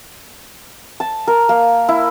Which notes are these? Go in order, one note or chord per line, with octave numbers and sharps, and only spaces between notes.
A5
A#4
A#3
E4